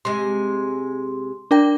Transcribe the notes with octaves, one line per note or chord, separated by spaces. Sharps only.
C3 G#3 C6
D4 A#4 G5